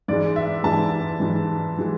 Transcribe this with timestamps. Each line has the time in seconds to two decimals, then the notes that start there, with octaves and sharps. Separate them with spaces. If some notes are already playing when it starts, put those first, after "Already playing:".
0.08 G#2 E3 G#3 D5
0.36 E5
0.64 G#2 E3 G#3 A5
1.20 G#2 E3 G#3
1.78 E3 G#3